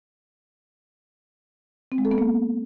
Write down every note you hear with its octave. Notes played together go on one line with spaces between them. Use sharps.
C4
G#3
A4
B3
A#3